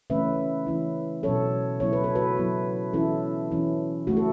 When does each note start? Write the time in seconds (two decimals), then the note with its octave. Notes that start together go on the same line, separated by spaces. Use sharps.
0.10 C#3 E3 A3 C#4 B4 E5
0.67 E3 C#4 E4
1.23 B2 F#3 C#4 A4 C#5
1.80 C#3 F#3 B3 E4 C#5
1.93 B4
2.04 A4
2.15 F#4 B4
2.37 F#3 B3 E4
2.93 E3 C#4 E4 A4
3.51 E3 C#4 E4
4.07 C#3 A3 E4 F#4
4.17 A4